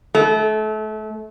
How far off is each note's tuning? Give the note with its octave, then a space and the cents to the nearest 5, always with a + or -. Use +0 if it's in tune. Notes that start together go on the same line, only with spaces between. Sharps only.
A3 -30